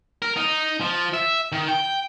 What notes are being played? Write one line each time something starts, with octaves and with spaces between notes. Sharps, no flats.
A#4
D#4
F3
E5
D#3
G5